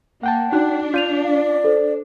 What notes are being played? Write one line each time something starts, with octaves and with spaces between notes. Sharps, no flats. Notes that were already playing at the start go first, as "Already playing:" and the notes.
A#3 F#5 G5 A5
D4 D#4 F#4 F#6
F4 G6 D#7 F7
D5 F5
A4 C5